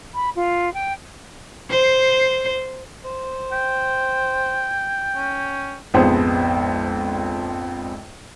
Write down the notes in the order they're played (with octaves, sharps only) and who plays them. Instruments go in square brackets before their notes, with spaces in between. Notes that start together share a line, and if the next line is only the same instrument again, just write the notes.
[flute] B5
F4
G5
[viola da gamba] C5
[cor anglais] C5
[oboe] G5
[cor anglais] C#4
[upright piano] A#1 F2 G#2 B3 G#4 C5